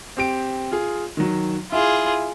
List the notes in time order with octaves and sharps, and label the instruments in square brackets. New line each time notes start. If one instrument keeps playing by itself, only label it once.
[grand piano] C4 G4 D7
F4 G#4
D#3 F#3
[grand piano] E4 [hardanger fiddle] F4 G#4